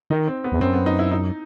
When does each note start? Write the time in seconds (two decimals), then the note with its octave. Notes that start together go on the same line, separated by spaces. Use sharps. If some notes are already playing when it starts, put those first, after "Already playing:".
0.10 D#3 D#4
0.28 C4
0.44 B3
0.52 E2
0.60 F#2 C4
0.74 B3
0.86 D#4
0.99 E4
1.11 D#4